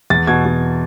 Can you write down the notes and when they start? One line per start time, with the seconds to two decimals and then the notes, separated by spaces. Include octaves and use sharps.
0.10 E2 A6
0.27 B2 G#6
0.45 B2